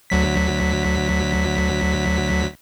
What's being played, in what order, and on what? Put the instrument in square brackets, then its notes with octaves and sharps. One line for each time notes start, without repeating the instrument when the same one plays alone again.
[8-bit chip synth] D2 F#3 B6